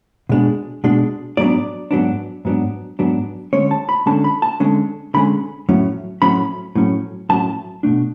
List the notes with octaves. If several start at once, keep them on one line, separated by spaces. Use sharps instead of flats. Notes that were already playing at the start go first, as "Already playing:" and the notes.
B2 G#3 D4
B2 G#3 D4
G#2 F#3 B3 D4 D5
G#2 F#3 B3 D4
G#2 F#3 B3 D4
G#2 F#3 B3 D4
D3 G#3 C#4 C#5
A5
B5
D3 G#3 C#4 A5
B5
A5
D3 G#3 C#4
D3 G#3 C#4 B5
A2 F#3 C#4
A2 F#3 C#4 B5
A2 F#3 C#4
A2 F#3 C#4 A5
B2 A3 D4